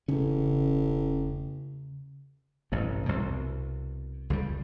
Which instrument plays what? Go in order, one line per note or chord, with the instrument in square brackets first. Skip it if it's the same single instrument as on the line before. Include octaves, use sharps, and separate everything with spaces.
[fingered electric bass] E1 C#4 [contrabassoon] A1 [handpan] C#3
[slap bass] A1 G2 C3
C2 B2
C#2 F#3 G3